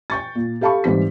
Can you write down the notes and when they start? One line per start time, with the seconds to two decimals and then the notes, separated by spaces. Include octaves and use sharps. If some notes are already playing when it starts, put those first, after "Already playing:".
0.10 G5 C#6 A6
0.35 A#2
0.61 G4 A4 F5 A5 B5 C#6
0.84 G#2 E3 G3 C4 B6